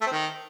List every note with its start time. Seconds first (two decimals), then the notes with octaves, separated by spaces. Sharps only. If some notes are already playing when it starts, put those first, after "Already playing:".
0.01 A3
0.06 C4
0.11 D#3